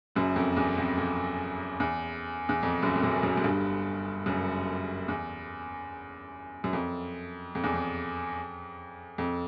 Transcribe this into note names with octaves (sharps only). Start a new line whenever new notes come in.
F#1 F#2
F2
E2
F2
F2
E2
E2
F2
F#1 F#2
F2
F#1 F#2
F#1 F#2
F#2
G1 G2
F#1 F#2
E2
F#2
F2
F2
E2
F2
F2